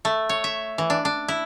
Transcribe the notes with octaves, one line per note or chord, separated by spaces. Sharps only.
A3
C#5
E5
E3
D4
D4
E4